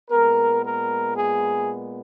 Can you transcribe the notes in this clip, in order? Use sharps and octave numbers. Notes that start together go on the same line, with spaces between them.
A#2 G#3 B3 A#4
A#4
G#4